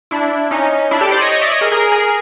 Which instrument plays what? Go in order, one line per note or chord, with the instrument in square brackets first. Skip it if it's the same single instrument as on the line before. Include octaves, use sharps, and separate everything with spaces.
[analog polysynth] D4 E4
C#4 D#4
D4 E4
G4 A4
C5 D5
C#5 D#5
C#5 D#5
D5 E5
C#5 D#5
G#4 A#4
G#4 A#4
G#4 A#4